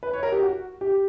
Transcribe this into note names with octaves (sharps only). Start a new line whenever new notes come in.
B4
C#5
A#4
G4
F#4
G4